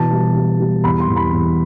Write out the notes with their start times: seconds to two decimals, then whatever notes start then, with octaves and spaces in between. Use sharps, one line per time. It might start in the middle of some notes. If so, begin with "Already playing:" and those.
Already playing: B2 E3 A5
0.11 G3
0.35 G3
0.60 G3
0.84 E2 B5
1.00 C6
1.08 E2
1.16 B5
1.33 E2